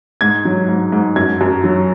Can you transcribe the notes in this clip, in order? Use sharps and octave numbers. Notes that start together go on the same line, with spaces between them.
G#2 G#6
F#3
G#2
G#2
F#2 G#6
F#2
F#3